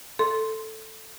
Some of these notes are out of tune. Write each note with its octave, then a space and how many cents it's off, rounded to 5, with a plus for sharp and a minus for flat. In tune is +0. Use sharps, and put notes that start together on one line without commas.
A4 +0 C6 +0